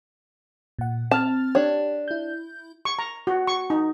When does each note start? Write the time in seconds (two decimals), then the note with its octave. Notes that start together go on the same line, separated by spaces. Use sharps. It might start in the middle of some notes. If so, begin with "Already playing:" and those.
0.79 A#2 F#5
1.11 C4 A5 F6 A6
1.55 D4 G4 C#5
2.08 E4 G6
2.85 C#6
2.99 A#5
3.27 F#4
3.47 C#6
3.70 D#4